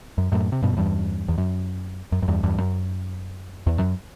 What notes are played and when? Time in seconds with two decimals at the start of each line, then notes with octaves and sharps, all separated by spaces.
0.18 F#2
0.32 F#2 A2
0.52 C3
0.62 G2 B2
0.73 F#2
0.77 E2 G2
1.28 E2
1.38 F#2
2.12 F#2
2.22 F#2
2.28 E2 G2
2.43 E2 G2
2.58 F#2
3.67 E2
3.78 F#2